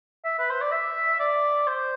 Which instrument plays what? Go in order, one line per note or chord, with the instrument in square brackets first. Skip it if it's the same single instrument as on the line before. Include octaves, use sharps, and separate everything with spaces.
[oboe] E5
B4
C5
D5
E5
D5
C5